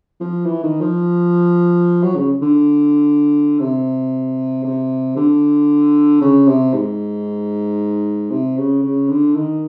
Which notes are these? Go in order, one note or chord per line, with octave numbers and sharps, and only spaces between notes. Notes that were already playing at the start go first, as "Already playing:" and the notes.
F3
E3
D#3
F3
F#3
C#3
D3
C3
C3
D3
C#3
C3
G#2
C3
C#3
C#3
D3
D#3